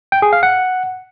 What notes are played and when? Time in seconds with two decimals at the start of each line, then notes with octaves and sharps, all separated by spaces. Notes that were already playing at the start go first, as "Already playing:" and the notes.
0.12 G5
0.22 G#4
0.33 F5
0.43 F#5